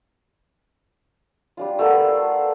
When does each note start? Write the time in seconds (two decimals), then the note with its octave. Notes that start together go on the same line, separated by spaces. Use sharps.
1.57 G3 D4 F4
1.79 A3 B3 F4 A#4